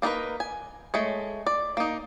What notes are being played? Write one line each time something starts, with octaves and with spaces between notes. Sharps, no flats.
A#3 D4 D#4 A#4 B4
G#5
G#3 A3 C#5
D5
A#3 D#4